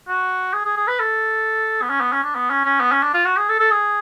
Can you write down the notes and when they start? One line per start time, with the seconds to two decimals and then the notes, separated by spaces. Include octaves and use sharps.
0.08 F#4
0.53 G#4
0.65 G#4
0.77 G#4
0.88 B4
1.00 A4
1.82 B3
1.90 C#4
2.01 B3
2.13 C#4
2.24 D4
2.35 B3
2.50 C#4
2.65 C#4
2.80 B3
2.92 C#4
3.03 D4
3.14 F4
3.25 F#4
3.37 G#4
3.49 A4
3.60 A4
3.71 G#4